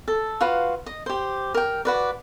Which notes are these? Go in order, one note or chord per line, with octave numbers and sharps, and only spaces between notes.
A4
F4 F#4 B4 F5
D#5
G4 C5
A#4 G5
F#4 B4 D5